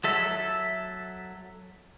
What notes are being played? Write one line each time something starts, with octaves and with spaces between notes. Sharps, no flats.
F#3 A4 E5